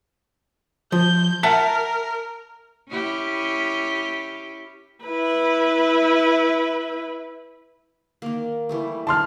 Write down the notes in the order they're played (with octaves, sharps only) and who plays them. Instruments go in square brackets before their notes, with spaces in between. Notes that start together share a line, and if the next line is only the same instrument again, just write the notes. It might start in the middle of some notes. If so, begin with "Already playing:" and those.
[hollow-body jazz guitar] F3 [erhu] G6
[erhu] A#4 [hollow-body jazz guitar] E5 F#5 A5
[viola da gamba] C#4 E4 G4
[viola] E4 B4
[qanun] D#3 A#3
E3 G3 A3
[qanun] D#3 G3 D5 [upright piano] A5 C6 F6